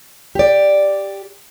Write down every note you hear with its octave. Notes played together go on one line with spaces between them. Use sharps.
G4 D5